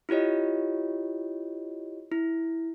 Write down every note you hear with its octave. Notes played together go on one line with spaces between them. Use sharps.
E4 F4 G4 C#5 D#5
E4